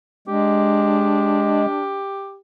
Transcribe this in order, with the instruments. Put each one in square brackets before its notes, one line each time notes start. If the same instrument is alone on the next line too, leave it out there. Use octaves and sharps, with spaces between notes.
[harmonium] G#3 [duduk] D4 [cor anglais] G4